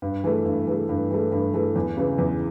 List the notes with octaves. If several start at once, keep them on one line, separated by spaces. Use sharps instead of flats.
G2
E3 A3
G2
E3 A3
G2
E3 A3
G2
E3 A3
E2
C#3 E3
E2